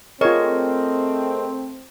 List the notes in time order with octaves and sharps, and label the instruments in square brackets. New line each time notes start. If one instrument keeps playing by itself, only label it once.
[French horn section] A3 C4 [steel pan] F4 C#5 [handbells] G#4 A#4 D#5